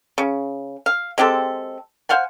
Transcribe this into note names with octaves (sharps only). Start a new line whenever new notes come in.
C#3
F5
G#3 C4 G4 A4
C5 F5 F#5 G#5